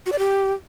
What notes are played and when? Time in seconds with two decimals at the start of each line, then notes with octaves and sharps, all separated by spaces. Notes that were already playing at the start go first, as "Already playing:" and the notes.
0.06 F#4
0.12 D5
0.19 G4